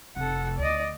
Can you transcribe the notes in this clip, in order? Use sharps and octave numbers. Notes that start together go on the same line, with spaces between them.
F1 A4 F#5
D2 D5 D#5